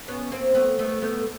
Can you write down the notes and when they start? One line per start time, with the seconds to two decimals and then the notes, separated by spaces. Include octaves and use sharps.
0.08 B3 C#4
0.32 A#3 C4
0.55 A3 B3
0.79 A3 B3
1.02 A3 B3